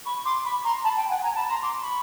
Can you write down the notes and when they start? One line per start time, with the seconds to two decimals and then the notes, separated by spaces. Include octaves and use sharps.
0.05 B5 C#6
0.25 C6 D6
0.44 B5 C#6
0.64 A#5 C6
0.84 A5 B5
0.97 G5 A5
1.10 F#5 G#5
1.23 G#5 A#5
1.35 A5 B5
1.49 A#5 C6
1.62 C6 D6
1.82 B5 C#6